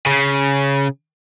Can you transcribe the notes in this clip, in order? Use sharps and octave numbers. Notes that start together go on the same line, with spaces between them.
C#3